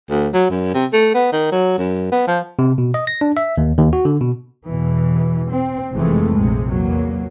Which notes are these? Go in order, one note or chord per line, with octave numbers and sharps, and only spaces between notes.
D2
F#3
F#2
C3
A3
B3
D#3
F#3
F#2
B3
F3
C3
B2
D#5
A#6
D4
E5
D#2
D#2
F#4
D3
B2
E2 B2 E3
C4
F1 F2 C3 E3 G#3 A3
A#1 C3 G#3
E2 F#3 A#3